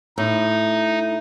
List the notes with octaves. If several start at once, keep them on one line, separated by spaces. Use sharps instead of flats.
A2 D#4